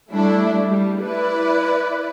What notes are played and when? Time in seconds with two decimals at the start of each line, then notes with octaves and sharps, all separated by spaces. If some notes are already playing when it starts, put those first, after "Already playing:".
0.11 G3 A3 D4 E4
0.69 G3
1.01 E4 B4 D5